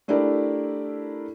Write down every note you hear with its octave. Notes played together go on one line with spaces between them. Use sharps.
A3 D4 E4 G4 A#4 D5